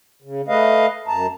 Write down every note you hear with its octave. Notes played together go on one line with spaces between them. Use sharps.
C#3
A3 B4 D#5 F5
F#2 A5 A#5